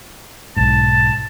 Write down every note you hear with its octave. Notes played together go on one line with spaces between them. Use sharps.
B1 G#2 A5